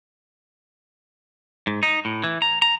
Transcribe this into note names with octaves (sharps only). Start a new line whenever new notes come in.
G#2
D#4
A2
E3
A#5
A#5